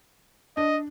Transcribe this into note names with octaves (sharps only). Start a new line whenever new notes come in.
D4 D#5